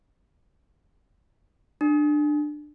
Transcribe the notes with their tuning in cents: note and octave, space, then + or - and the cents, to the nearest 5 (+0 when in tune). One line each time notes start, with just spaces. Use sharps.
D4 +20